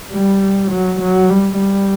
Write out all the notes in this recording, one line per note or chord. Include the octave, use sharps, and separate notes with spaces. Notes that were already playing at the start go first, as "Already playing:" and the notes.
G3
F#3
F#3
G3
G3